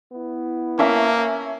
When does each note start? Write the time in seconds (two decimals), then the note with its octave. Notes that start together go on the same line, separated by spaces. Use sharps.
0.12 B3 E4
0.79 A#3 C#4 E5 A5